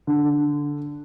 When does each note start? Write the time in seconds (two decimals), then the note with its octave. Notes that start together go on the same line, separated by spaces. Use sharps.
0.07 D3